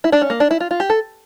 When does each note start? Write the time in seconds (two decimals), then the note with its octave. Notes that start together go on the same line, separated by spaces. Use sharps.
0.04 E4
0.12 D4
0.22 C#4
0.30 A#3
0.40 D4
0.51 E4
0.60 F4
0.71 F4
0.80 G4
0.90 A4